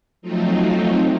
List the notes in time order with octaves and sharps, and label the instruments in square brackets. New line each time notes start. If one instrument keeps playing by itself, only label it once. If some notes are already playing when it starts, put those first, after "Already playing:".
[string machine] F3 F#3 A3 C4 D#4 F4